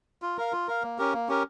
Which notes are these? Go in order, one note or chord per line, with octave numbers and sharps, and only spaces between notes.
F4
A#4 F5
F4
A#4 F5
A#3
C#4 G4 A#4
A#3
C#4 G4 A#4